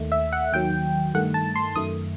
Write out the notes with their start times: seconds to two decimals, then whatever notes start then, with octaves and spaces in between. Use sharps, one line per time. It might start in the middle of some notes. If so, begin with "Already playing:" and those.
Already playing: D#2 D#3 A3
0.12 E5
0.32 F#5
0.53 D#2 D#3 F#3 G5
1.14 G2 D#3 A3 F#5
1.34 A5
1.55 C6
1.76 F#2 D#3 A3 D#6